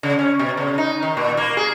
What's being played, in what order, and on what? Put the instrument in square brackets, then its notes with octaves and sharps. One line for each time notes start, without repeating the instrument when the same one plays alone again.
[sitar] C#3
C#4
B2
C#3
D#4
D#3
A#2
A#3
G#4